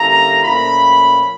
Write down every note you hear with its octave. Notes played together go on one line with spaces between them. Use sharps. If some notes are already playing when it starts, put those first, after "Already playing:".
Already playing: D3 G3 A#3 C#4 E4 A#5
A#2 F3 A3 C#4 B5